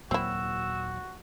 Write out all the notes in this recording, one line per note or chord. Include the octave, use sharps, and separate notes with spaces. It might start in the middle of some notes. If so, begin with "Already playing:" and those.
D#2 A#2 F#3 C4 E4 F#4 E6